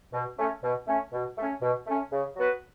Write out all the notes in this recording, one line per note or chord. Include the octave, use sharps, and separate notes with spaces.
B2
A3 C#4
B2
A3 C#4
B2
A3 C#4
B2
A3 C#4
C#3
F#3 B3 F#4 B4